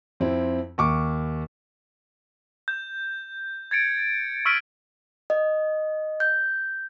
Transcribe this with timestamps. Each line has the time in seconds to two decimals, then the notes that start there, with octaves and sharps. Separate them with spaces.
0.20 F2 C4 E4
0.78 D#2 C#6 D6
2.68 G6
3.71 G#6 A6 C#7 D7
4.45 C#6 E6 F6 B6 D7 D#7
5.30 D#5
6.20 G6